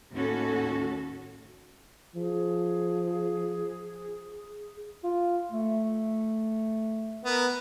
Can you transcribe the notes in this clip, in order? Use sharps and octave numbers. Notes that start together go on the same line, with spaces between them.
D#2 A2 C#4 F#4 A4
F3 G#4
F4
A3
B3 A#4